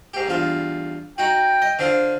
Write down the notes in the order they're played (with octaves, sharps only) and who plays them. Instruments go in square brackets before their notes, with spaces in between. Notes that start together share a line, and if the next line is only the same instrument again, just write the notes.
[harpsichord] G#2 G4
E2 G2 F4
[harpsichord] D#4 F#4 [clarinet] G5
[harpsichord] D#5
D3 C4 F4